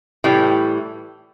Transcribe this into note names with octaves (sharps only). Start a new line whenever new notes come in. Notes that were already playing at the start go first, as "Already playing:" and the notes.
A2 E3 G3